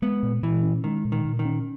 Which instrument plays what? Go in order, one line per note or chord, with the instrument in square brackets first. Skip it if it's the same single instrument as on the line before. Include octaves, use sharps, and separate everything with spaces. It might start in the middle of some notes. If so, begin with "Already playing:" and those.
[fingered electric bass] G#3 [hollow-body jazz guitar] B3
[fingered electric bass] A#2
[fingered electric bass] A#2 [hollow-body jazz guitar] E3
[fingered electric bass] C#4
[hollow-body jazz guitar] D#3 [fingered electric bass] G#3
[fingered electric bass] A#2
[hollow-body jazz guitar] D#3
[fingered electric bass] A#2
[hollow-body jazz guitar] D#3
[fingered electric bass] C#4